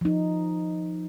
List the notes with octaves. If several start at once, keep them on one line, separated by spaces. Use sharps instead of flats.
F3 D#4